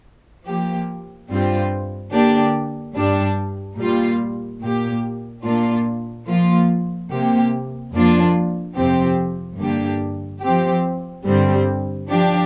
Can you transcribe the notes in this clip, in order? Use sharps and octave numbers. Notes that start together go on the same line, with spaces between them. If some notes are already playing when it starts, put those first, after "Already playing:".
F3 A#3 G4
G2 G3 C4 F4
D3 A#3 D4 G4
G2 G3 D4
A#2 G3 A#3 F4
A#2 A#3 G4
A#2 A#3 D4 F4
F3 A#3 F4
C3 A#3 G4
F2 F3 A#3 D4 F4
F2 C3 F3 C4 G4
G2 D3 A#3 D4 G4
F3 C4 G4
G2 D3 G3 C4
F3 D4 G4